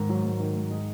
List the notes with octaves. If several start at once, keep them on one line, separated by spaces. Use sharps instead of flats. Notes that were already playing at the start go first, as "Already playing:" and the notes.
Already playing: G#2 D#3
F#3
G#2
D#3
G#2
G#3